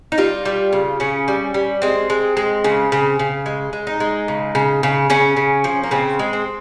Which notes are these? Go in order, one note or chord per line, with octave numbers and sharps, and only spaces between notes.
D#4
G3 F4
G3
C#3
C#3 C#4
G3
G3
G#3 C4
G#3
G#3
C#3
C#3
C#3
G#3
G#3
D#4
G#3
C#3
C#3
C#3
C#3 C#4
C#3
F3
A#3
C#3 C4
G#3
C4